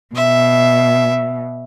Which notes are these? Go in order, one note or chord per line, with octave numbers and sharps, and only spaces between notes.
B2 E5